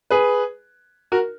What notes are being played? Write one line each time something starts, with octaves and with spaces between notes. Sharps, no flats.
G#4 B4
F#4 A#4